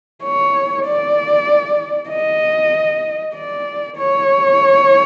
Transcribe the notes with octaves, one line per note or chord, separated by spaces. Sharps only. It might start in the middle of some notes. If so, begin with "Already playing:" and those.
C#5
D5
D#5
D5
C#5